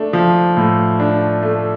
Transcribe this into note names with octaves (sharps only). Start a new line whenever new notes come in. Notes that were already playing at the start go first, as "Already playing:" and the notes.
Already playing: A3 D4
F3
A2
D4
A3